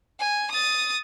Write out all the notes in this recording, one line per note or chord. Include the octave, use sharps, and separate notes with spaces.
G#5
D#6 A6